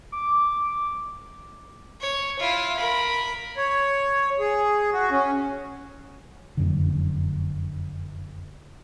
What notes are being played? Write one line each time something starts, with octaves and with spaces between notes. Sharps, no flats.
D6
C#5
E4 F4
A#4 B5
C#5
G#4
F#4
C#4
F1 F#2 D3